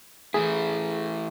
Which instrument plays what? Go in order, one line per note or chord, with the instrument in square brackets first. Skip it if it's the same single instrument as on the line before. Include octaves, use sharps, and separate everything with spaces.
[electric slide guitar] E3 A3 E4 [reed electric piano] G#4